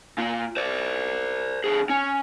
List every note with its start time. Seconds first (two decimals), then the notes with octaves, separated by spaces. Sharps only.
0.18 A#2 F4
0.57 C5 D5
1.64 D3 G#4
1.89 C#4